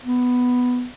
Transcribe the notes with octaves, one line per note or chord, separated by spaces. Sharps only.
B3